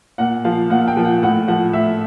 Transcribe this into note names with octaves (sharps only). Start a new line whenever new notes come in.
A#2 F#5
F3 F5
A#2 F#5
G5
F3
F#5
A2 F#5
F3 F#5
A2 E5